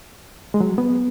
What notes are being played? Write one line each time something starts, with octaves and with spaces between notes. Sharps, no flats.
G#3
F#3
B3